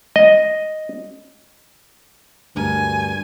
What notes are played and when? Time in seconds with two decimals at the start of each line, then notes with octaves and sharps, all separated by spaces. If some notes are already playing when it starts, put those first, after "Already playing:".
0.16 D#5
2.56 D2 G2 A#4 G#5 A5